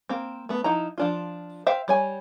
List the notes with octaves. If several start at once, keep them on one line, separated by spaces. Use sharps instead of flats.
A#3 C4
A3 B3
F3 D#4 E4 A#5
F3 D4 F4
C5 E5 F5 G5
G3 C#5 G#5